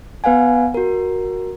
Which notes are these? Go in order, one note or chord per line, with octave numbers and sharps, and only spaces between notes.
B3 B4 F5 F#5 G#5
F#4 A#4